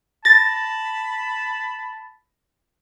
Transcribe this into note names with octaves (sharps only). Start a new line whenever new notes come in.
A5 B5 A6 A#6